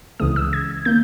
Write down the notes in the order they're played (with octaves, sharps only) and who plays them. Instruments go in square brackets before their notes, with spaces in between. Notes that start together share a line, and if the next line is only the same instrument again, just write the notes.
[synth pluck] C#2 C#3 E3 G#3 D#6
E6
G#6
D#3 A#3 G6